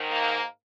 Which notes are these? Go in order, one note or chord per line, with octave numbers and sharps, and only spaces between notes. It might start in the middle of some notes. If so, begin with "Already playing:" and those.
Already playing: G#2 D#3
A#3